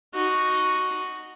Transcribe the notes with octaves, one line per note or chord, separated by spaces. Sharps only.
D#4 F#4